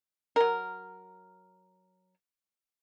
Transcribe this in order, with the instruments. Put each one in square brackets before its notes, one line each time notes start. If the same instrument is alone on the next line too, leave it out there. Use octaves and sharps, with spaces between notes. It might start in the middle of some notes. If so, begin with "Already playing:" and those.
[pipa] F#3 A#4